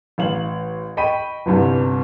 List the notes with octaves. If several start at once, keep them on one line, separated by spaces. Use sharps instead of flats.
A1 F5 F#7
D#5 G5 B5 C#6 B6 D#7
G1 C2 G2 C3